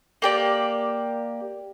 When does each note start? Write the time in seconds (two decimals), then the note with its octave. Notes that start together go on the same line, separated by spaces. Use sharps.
0.22 A#3 G4 D5